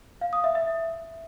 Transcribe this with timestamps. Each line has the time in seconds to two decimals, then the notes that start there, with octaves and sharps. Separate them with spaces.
0.21 F5
0.33 D#6
0.44 E5
0.55 E5